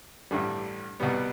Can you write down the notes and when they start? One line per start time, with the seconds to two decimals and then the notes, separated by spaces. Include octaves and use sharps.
0.31 A1 G2 D3 G3
1.00 C2 B2 G3 B3